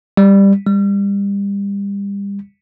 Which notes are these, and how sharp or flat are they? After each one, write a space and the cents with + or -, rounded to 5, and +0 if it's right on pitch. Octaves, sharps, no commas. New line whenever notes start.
G3 +10
G3 +30